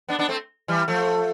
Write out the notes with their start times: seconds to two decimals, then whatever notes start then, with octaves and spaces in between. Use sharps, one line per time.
0.08 B3 D4
0.19 B3 D4
0.29 A3 C4
0.68 E3 G3
0.88 F3 A3